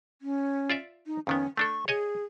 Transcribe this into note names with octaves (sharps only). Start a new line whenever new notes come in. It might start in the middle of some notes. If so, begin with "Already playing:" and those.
C#4
F4 D5 E5
D#4
F2 D#3 B3 C#4
A3 D4 A4 C#6
G#4 C#5 D#5 G#5